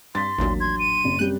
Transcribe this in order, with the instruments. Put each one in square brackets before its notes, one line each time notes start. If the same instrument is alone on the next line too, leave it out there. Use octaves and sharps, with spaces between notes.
[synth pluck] G2 [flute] C6 [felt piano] A6 B6
[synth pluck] A1 D#2 A#2 [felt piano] F#3 D4
[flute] C6 [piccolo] G#6
[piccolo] D#7
[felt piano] F#1
[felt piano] F#2 C3 G3 [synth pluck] F#6 G6